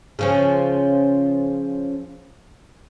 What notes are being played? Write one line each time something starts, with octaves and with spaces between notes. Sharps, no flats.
C#3 F3 C#4